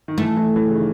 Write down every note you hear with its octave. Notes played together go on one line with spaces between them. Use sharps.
D#3
E3 A3
E3
E3
C#3
D#3